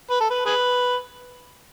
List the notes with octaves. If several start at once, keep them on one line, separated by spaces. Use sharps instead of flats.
B4
A4
B4
G#4 B4